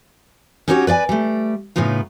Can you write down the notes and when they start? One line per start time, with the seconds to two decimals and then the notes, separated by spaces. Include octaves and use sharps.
0.68 C#4 D#4 F#4 G4 A#4 C#5
0.87 B4 D5 E5 G#5
1.09 G3 A3
1.76 A2 C#3 B3 D#4 F4